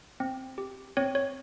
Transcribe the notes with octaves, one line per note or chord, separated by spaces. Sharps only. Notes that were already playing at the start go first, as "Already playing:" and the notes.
C4
G4
C4 C#5
C#5